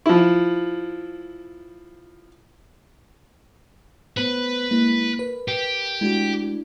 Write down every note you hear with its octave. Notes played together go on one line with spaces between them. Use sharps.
F3 E4
A3 B3 B4 C5
G#3 A#3 E4
A#4 B4
G4
G#3 A3 D4 E4 F#4